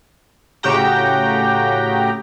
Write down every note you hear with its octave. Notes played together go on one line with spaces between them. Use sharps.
A2 C#3 F#4 G4 G5 A#5